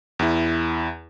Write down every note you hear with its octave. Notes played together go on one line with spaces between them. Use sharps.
E2 E4